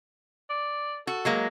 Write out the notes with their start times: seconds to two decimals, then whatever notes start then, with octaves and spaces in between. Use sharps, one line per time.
0.50 D5
1.07 F#4 A4
1.25 F#3 G#3 A#3